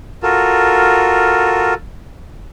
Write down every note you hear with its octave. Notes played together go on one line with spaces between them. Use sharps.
F4 F#4 A4 A#4